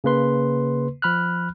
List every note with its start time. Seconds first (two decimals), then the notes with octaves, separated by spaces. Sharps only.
0.04 C#3 A#3 B4 C6
1.02 F3 B5 F6 F#6